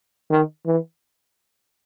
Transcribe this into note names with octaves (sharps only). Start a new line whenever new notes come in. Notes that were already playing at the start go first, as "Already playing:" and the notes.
D#3
E3